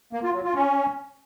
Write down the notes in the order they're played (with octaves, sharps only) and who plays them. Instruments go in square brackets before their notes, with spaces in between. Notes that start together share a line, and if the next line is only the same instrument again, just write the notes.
[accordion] A#3
F4
F#3
F4
C#4